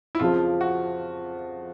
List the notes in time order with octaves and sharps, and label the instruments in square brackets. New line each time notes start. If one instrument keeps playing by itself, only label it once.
[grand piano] E4
[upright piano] F2 C#3 F3 [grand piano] F4
[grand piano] F#4